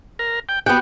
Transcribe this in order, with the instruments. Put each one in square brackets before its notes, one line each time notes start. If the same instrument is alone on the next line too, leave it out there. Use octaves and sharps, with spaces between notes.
[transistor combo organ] A#4
G5
[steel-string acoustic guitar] B3 G5 [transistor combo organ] F#4 G4